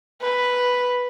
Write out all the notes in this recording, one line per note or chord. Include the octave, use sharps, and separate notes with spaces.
B4